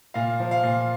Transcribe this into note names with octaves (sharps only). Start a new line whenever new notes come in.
A#2 F5
F3
F5
A#2